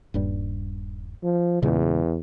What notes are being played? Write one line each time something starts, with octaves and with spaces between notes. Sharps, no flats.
D#1 G2 G3
F3
E2 A#2 C#3 G#3